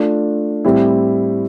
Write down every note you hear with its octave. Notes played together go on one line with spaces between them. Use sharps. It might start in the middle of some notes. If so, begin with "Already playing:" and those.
Already playing: A3 D4 F4
A2 G3 C4 E4